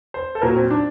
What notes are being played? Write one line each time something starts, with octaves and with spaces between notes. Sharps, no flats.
C5
A4
A#2 F#3 A#4
C4
D4